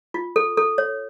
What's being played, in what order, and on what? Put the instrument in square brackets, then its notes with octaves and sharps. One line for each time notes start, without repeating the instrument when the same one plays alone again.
[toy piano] F4
A4
A4
C#5